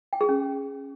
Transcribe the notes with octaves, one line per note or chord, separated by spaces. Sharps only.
G5
G#4
C#4